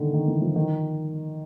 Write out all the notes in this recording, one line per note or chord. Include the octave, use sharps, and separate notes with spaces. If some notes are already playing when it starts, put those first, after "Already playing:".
Already playing: D3 D#3
D#3
E3
F3
D#3